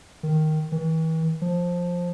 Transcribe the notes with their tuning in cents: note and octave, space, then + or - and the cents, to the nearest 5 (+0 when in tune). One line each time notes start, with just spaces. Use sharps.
D#3 +0
E3 -40
F3 +10